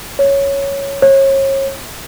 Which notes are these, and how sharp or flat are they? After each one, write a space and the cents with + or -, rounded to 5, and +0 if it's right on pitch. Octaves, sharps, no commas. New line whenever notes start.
C#5 +0
C#5 -35